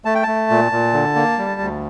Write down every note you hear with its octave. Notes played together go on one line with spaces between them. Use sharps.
A3 A5
G5
A3 A5
A#2
A#2
D3
A#3
G3
D2